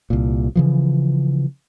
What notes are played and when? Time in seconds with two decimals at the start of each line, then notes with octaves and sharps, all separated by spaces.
0.10 C2 A#2
0.55 C#3 E3 F3